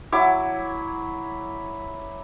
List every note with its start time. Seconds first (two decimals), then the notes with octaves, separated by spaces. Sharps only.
0.12 F#3 E4 D6